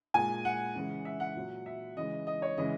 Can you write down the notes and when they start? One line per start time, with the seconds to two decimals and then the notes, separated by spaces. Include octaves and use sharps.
0.14 A#2 G#3 G#5
0.45 F#5
0.75 C#3 E3 G#3
1.05 E5
1.20 F#5
1.36 A#2 F#3
1.66 E5
1.97 C#3 E3 G#3 D#5
2.27 D#5
2.42 C#5
2.57 C#3 E3 G#3 D#5